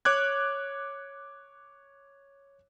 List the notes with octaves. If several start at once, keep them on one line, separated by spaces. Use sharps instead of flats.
C#5 D6 F#6 G#6